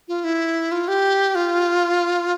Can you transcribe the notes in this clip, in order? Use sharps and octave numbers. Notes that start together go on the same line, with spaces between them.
F4
E4
F4
G4
F4